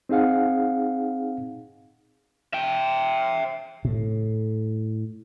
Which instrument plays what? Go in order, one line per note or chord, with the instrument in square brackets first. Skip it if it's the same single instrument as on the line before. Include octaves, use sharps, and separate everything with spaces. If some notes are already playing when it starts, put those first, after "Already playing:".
[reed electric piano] C4 D#4 G#4 F5 F#5
[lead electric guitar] E5 G5
[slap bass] A2